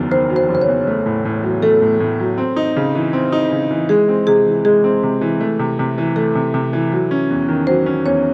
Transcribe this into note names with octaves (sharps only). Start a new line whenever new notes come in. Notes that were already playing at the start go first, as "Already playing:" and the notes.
Already playing: F#1 E2 D#3 F#3
D#3 C5
F#3
C5
F#1
C5
C#5
E2
A3
A2
A2
F#3
A3 A4
A2
A2
F#3
C4
D#4
C#3
E3
C4
D#4
C#3
E3
G#3 G#4
C4
C3 G#4
E3
G#3 G#4
C4
C3
E3
A3
C3
C3
E3
A3 A4
C3
C3
E3
F#3
C#4
E2
D#3
F#3 C5
C#4
E2 C#5